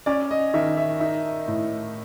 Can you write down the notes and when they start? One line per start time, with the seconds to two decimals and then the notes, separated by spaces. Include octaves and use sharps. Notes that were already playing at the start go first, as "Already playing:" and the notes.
0.06 C#4 D5
0.31 D#5
0.54 D#3 E5
0.77 E5
1.00 D#4 E5
1.48 A2